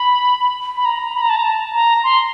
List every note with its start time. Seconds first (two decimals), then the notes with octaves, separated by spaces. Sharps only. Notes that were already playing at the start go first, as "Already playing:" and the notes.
Already playing: B5
0.77 B5
0.85 A#5
1.14 B5
1.22 A#5
1.29 A5
1.36 A#5
1.44 A5
1.73 A#5
2.04 C6